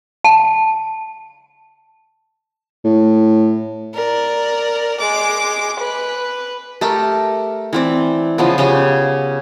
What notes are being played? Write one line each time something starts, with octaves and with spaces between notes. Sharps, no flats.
A5
A2
A#4 D5
G#3 D6
B4
A3 G4 A4 A#4
E3 C4 D5
C#3 F3 B3
C#3 C#4 G4